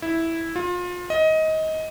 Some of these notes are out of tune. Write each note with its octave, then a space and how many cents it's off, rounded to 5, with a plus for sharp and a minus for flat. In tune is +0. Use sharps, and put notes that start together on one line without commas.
E4 -5
F4 +30
D#5 +20